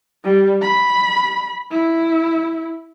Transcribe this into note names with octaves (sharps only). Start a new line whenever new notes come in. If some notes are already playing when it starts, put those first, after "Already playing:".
G3
B5
E4